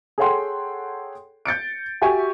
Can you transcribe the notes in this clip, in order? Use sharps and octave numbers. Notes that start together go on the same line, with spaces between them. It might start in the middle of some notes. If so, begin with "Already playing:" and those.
G#4 A4 C#5 F#5 G5 C6
G6 A6 C#7 D7
F#4 G4 E5 G5 G#5 C#6